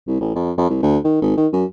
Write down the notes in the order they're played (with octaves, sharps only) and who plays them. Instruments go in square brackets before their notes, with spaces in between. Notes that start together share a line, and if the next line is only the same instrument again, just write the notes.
[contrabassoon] C2
A1
F2
F2
C2
D2
D#3
G#1
D#3
F#2